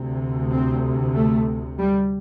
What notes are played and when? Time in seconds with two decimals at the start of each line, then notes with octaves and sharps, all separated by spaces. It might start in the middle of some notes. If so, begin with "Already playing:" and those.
Already playing: D2 C3
0.52 C4
1.15 A3
1.78 G3